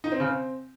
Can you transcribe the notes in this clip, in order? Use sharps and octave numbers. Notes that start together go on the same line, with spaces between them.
D#4
C4
C#3
C4